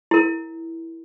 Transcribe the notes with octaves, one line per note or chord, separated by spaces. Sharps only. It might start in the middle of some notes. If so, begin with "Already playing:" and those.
E4 A#4